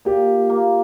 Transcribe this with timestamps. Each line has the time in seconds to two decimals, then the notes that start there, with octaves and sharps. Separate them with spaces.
0.05 A#2 G4
0.50 A#3